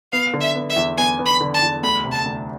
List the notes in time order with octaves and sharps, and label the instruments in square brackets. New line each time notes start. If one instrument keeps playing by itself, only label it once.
[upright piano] B3 [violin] F5
[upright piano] D3
[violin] E5
[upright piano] B3
[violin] E5
[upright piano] E2
[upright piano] B3 [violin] G#5
[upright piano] B3
[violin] B5
[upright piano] D3
[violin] A5
[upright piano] E2
[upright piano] D2 [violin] B5
[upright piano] C3
[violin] A5
[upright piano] D2